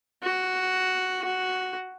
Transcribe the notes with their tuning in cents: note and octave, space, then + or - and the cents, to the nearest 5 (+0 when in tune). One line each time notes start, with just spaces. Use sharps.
F#4 +5
F#4 +0